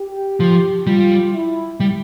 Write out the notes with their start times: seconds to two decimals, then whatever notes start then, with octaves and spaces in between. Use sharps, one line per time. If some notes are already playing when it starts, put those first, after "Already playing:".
Already playing: G4
0.40 F3
0.87 G3 F4
1.33 E4
1.80 G3